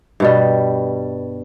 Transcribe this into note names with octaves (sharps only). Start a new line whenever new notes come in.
G2 B2 G3